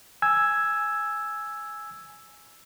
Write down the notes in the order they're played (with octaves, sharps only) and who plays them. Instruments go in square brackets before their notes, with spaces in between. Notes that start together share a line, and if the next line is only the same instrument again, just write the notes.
[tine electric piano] G#5 E6 G#6